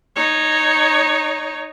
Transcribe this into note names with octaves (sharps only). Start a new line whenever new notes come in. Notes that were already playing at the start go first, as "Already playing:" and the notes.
D#4 C#5